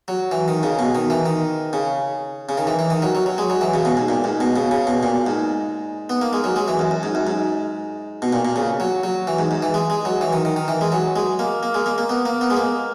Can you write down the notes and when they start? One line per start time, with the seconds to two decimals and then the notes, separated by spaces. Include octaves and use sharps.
0.08 F#3
0.31 E3
0.48 D#3
0.63 C#3
0.79 B2
0.95 D#3
1.10 E3
1.26 D#3
1.73 C#3
2.49 C#3
2.58 D#3
2.67 E3
2.79 E3
2.90 D#3
3.02 F#3
3.15 F#3
3.26 F#3
3.38 G#3
3.50 F#3
3.61 E3
3.74 C#3
3.85 B2
3.97 G#2
4.08 A#2
4.24 G#2
4.40 B2
4.56 C#3
4.71 C#3
4.87 B2
5.03 A#2
5.26 G#2
6.10 B3
6.22 A#3
6.33 G#3
6.44 F#3
6.56 G#3
6.68 E3
6.79 F#2
6.91 F#2
7.03 G#2
7.15 F#2
7.27 G#2
8.22 B2
8.33 A#2
8.45 A#2
8.56 C#3
8.80 F#3
9.03 F#3
9.27 E3
9.39 G#2
9.51 G#2
9.62 E3
9.74 G#3
9.90 G#3
10.05 F#3
10.21 E3
10.33 D#3
10.45 D#3
10.56 D#3
10.68 E3
10.81 G#3
10.92 F#3
11.16 G#3
11.39 A#3
11.63 A#3
11.74 G#3
11.86 A#3
11.98 A#3
12.09 B3
12.25 A#3
12.41 B3
12.50 G#3
12.57 A#3